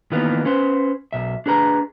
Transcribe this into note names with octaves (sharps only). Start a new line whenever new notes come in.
D#3 E3 A#3 B3 F4
C#4 B4 C5
B1 E5
D4 G#4 B4 A#5